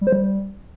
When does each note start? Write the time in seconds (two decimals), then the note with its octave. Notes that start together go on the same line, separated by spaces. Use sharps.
0.01 G3
0.07 C5
0.12 G3